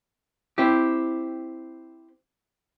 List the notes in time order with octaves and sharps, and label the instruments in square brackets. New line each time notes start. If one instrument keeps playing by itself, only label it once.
[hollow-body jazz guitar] C4 E4 G4